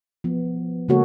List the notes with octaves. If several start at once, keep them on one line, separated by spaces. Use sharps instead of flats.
F3 B3
C#3 G#3 A#3 F#4 A4 C#5